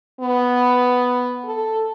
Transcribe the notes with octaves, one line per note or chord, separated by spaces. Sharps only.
B3
A4